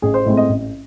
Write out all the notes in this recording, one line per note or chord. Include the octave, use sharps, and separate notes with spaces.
A1 G#4
C5
A2 G#3 C4
D#5
A1